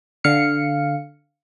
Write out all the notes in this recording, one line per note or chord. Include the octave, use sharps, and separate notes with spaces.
D3 F5 C#7